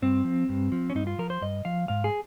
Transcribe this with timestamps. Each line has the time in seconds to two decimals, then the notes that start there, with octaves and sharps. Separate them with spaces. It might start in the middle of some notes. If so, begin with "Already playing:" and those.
0.02 G2 C4
0.24 F3
0.49 G2
0.72 F3
0.90 C#4
0.95 G2 D#4
1.07 F4
1.18 F3 A#4
1.30 C5
1.42 G2 D#5
1.65 F3 F5
1.88 G#2 F5
2.04 G#4